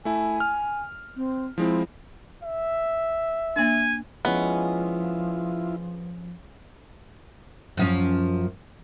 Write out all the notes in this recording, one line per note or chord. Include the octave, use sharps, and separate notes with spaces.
A3 E4 G#5
F6
C4
F3 G#3 C4 E4
E5
A#3 D4 G#5
F3 G#3 B3 C#4 E4 F4
F#2 F3 C#4